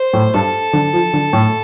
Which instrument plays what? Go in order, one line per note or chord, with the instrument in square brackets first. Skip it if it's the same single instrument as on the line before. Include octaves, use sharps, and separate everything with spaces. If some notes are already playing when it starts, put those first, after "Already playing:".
Already playing: [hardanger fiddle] C5
[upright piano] A2
[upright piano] G2 [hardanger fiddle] A4
[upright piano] D3
F3
D3
A2